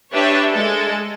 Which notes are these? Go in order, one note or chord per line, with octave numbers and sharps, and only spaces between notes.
D4 G4 B4 C#5 E5
G#3 A4